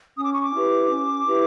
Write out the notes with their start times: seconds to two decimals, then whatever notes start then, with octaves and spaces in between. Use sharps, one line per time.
0.16 C#4 D#6
0.24 D6
0.33 C#6
0.42 D6
0.53 E4 G4 B4
0.90 C#4
1.27 E4 G4 B4